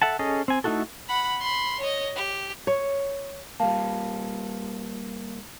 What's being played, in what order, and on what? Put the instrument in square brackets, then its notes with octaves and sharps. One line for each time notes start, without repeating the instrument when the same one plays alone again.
[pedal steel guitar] A4 E5 F#5 A5
C#4 G#4 A4 D#5
C4 G#5
A3 D#4 E4 F#4 A4
[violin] F#5 B5
B5 C6
C#5 D#5
G4
[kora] C#5
[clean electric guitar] G3 A#3 [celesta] F5 A5